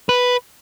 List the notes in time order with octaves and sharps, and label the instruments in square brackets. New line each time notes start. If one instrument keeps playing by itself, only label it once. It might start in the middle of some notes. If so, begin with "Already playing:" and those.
[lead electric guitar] B4